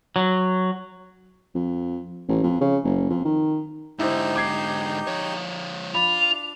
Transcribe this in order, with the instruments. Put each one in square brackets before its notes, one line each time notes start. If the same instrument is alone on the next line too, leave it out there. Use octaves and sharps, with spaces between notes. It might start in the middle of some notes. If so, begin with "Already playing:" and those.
[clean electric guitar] F#3
[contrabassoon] F2
A1
F2
C#3
F#1
F2
D#3
[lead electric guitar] G#2 D3 [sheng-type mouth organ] D#4 G4 G6 [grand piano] E4 C5
[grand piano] D6 G#6 C7
[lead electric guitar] F3 C#5
[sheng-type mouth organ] D4 [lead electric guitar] F4 [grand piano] B5 [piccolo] F7